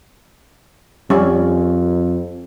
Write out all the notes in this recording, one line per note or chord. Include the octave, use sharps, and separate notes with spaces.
F2 G3 C#4